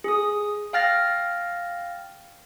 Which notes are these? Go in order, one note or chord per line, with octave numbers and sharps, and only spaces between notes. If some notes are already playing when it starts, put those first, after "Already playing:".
G#4 D#6
F5 G5 F6 A6 A#6